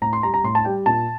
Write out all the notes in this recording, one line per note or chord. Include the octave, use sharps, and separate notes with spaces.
A2 A#5
C6
G3 A#5
A#5
A2 C6
A5
G3 G5
A#2 A5